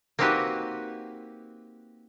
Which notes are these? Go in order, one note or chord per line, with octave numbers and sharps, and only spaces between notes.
A#3 C4 D#4 F#4 G4 B4